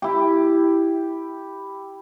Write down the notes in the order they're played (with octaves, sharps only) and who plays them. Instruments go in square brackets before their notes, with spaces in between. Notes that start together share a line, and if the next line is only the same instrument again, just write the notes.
[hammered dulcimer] E4 G4